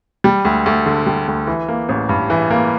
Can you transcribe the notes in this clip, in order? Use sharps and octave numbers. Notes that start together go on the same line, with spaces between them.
G3
D2
D2
D3
G3
D2
E3
A#3
A1
G2
E3
A#3